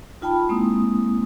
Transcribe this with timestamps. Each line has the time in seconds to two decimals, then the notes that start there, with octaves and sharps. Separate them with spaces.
0.21 D#4 F4 G5 A5 B5
0.49 G#3 A#3 C4 E4 D#6